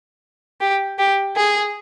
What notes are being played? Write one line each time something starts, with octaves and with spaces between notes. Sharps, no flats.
G4
G4
G#4